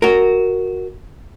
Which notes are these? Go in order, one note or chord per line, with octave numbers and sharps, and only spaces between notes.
F#4 A#4